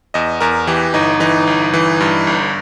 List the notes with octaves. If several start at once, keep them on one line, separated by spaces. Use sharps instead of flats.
E2 D#5
E2 A#4
E3 G4
G1 D#4
E3 D#4
G1
E3
G2
G1